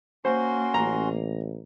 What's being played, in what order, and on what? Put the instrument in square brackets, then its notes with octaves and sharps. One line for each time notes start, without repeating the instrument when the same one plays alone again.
[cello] A#3 [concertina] C#4 F#4 C6 [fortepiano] C5
[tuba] A1 [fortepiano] A#5